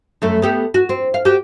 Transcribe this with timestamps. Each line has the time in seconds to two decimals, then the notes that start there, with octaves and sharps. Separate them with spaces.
0.22 F#2 A3
0.42 B3 G4 A4
0.74 F#4
0.89 C4
1.14 F5
1.25 F#4 G4